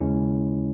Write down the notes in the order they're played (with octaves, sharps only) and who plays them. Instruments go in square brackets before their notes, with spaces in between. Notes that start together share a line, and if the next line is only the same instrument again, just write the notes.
[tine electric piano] D#2 C#3 G#3 C#4 E4